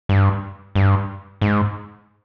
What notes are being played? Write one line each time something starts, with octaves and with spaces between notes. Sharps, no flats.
G2
G2
G#2